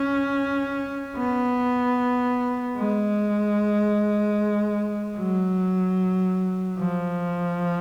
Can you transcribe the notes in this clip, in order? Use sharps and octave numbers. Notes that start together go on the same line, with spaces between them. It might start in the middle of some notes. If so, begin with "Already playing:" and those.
Already playing: C#4
B3
G#3
F#3
F3